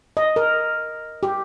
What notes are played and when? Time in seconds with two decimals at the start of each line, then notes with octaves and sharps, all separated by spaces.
0.17 D#5
0.36 A#4
1.23 G4